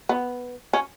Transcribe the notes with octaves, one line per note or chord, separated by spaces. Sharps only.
B3
C#4